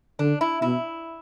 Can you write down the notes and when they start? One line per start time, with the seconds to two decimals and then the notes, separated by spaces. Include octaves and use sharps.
0.19 D3 D4
0.41 E4
0.62 B2 E4